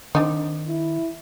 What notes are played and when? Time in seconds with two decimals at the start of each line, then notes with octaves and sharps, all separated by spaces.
0.15 D#3 C4 D4 D#4
0.67 E4